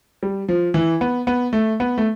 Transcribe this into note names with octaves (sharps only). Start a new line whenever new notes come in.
G3
F3
E3
B3
B3
A3
B3
A3